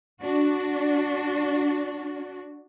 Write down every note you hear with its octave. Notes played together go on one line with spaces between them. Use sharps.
D4 F#4